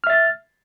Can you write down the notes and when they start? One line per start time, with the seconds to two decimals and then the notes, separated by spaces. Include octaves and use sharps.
0.04 F6
0.07 E5
0.10 A6